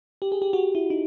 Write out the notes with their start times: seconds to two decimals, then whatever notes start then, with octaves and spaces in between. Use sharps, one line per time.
0.22 G4
0.32 G#4
0.42 G4
0.53 F#4
0.75 E4
0.90 D#4